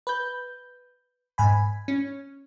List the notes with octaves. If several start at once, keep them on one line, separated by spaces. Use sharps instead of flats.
B4 G6
G#2 G#5 B5
C#4